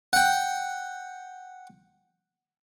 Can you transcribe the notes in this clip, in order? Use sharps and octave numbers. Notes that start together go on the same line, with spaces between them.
F#5 G5